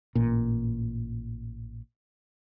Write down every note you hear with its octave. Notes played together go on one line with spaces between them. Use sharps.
A1 A#2